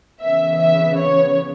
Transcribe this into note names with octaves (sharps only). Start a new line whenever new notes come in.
C#3 E3 B3 E5
E5
C#5